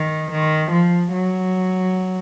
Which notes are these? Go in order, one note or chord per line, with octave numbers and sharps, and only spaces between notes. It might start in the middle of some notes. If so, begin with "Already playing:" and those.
Already playing: D#3
D#3
F3
F#3